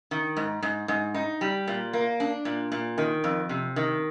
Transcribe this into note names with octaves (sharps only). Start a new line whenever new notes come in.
D#3
G#2
G#2
G#2
D#4
G3
A#2
A#3
D4
A#2
A#2
D#3
F2
C3
D#3